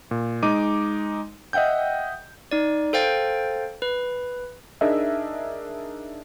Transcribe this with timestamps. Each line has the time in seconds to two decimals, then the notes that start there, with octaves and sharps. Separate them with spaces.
0.11 A#2
0.43 G#3 D#4 D6 D#7
1.53 D#5 E5 F#5 G5 G6
2.51 D#4 D5
2.93 A4 C5 F5 G5 A6
3.82 B4
4.81 D4 D#4 G#4 A#4 D#5 E5